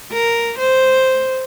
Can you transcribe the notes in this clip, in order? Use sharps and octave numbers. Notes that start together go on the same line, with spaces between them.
A#4
C5